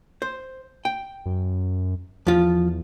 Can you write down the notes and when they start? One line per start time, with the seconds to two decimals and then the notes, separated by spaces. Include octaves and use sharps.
0.22 C5
0.85 G5
1.26 F#2
2.27 E2 F3 F4